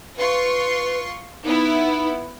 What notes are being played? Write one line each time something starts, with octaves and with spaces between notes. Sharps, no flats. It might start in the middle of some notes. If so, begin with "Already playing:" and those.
F4 B4 C6 C#6
B3 D#4 E4